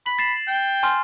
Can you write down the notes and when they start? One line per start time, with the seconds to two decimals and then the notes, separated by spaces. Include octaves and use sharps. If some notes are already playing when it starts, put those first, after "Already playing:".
0.06 B5 F#7
0.19 A6 C7 E7
0.47 G5
0.83 G#5 C6 F6